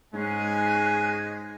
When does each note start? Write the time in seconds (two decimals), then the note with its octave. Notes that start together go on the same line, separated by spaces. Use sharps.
0.13 G#2 G#3 C#4 G#4 G#5 F#6